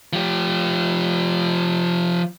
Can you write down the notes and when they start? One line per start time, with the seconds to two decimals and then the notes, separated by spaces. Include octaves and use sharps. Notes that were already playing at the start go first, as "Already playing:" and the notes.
0.13 F3 G4